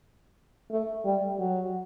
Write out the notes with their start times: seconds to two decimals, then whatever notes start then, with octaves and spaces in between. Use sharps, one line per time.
0.71 A3
1.05 G3
1.40 F#3